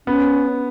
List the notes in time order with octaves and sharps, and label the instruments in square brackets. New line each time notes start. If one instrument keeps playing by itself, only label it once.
[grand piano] B3 [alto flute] C#4